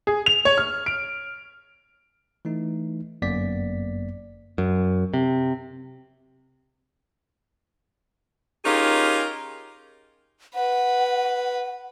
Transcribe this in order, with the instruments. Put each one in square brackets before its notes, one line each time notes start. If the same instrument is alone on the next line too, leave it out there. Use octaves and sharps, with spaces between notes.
[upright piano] G#4
F7
C#5
F6
D7
[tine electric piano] E3 A3 D#4
G1 F#2 A#3 B3 D5 B6
[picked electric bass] F#2
C3
[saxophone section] C#4 D#4 F4 G4 G#4 A#4
[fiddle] B4 [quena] F#5